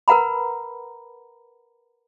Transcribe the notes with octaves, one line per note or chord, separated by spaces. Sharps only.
A#4 B4 F#5 A#5 B5